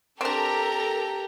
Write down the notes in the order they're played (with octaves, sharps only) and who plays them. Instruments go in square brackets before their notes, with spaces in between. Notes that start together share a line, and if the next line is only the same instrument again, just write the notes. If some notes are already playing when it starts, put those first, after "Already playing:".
[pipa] C4 D4 [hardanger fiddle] G4 [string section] A4 [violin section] A#4 A#5